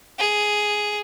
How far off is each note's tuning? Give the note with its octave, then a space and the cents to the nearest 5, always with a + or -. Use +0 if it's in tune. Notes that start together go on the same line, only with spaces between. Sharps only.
G#4 +5